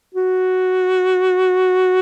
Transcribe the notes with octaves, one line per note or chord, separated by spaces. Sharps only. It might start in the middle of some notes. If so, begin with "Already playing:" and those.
F#4